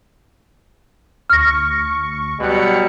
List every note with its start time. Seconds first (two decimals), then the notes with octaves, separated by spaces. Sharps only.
1.30 D2 C#6 F6 A#6
2.40 B2 F#3 G3 F#6 C#7